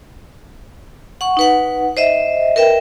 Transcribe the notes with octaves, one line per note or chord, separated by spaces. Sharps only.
F#5 C#6
D#4 B4 F#5
C5 D#5 E5
A#4 B4 E5 G5